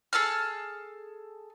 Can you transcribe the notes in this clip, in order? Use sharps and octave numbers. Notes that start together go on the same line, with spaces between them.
G#4 A4 A5 F6